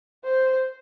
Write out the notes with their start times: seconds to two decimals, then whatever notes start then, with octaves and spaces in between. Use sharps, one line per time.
0.24 C5